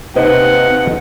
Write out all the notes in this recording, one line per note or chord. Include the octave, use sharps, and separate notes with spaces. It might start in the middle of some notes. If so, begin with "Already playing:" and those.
D#2 C3 D#4 B4 C5 F#5